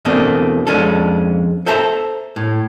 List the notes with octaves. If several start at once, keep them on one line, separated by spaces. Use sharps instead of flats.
E2 B2 A3 A#3 C4 D4
F2 G#3 C#4 D4 A4
A4 C5 E5 A5 A#5
A2